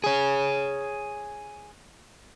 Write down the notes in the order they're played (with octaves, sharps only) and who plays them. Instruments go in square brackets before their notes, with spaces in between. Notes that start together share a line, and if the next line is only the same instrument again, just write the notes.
[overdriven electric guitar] G#4 C#5